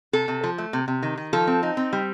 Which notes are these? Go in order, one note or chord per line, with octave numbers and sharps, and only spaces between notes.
C3 A4
C3
F3
A3
C3
C3
D#3
D#3
F3 A4
C4
D#4
C4
G3